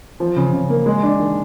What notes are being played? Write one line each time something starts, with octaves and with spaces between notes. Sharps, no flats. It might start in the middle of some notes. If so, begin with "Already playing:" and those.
F3
C#3
C#3
A#3
G#3
D4
D#3